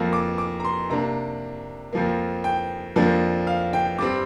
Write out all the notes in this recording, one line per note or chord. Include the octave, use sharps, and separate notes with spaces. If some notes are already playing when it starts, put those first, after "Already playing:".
Already playing: F2 F3 A#3
D6
D6
A#5
C6
C3 A#3 D4 A#5
F2 F3 A#3
G5
F2 F3 A#3 D4
F5
G5
G2 G3 C4 D6